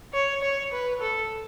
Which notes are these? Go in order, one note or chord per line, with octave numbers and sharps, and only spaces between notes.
C#5
C#5
B4
A4